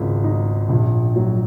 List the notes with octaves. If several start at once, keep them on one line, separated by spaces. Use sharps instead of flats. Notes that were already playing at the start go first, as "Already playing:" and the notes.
Already playing: G#1 C#2
D#4
A#1
F#3